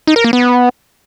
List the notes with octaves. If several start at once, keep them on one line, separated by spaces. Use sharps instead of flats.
D#4
A#4
A#3
B3